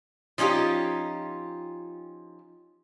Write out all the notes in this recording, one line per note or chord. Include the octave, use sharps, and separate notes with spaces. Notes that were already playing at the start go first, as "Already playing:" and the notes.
F3 C#4 D#4 F4 G4